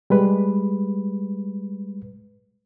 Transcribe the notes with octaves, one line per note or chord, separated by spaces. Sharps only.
G3 G#3 B4